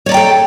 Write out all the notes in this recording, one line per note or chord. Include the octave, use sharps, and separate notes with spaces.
A4 C#5 D5 G5 A#5